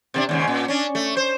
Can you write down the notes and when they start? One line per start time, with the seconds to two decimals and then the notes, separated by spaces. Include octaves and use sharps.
0.14 C3 A#3 D4
0.29 D#2 G#2 C#3
0.47 A#2
0.68 C#4 D4
0.95 A3
1.17 C5